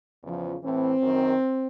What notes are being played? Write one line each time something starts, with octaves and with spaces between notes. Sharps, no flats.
E2 C#3 F3
A2 E3 C4
F#2 D#3